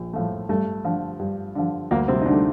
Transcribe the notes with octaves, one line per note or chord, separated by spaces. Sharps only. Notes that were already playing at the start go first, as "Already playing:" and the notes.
Already playing: A#1
A2 F3 A3
G2 A3
D3 F3
G2
D3 F3
D2 A#3
C3 C4
D#4
D3 D4
A3